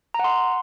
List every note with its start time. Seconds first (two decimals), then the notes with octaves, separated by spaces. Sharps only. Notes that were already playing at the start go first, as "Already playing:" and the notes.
0.14 A#5
0.19 F#5
0.24 C6